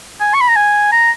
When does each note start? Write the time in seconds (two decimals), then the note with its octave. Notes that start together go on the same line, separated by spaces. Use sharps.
0.20 G#5
0.34 C#6
0.41 B5
0.48 A#5
0.56 G#5
0.92 A#5